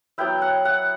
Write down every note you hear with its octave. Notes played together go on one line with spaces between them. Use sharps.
F#3 B3 E4 G5
F#5
F#5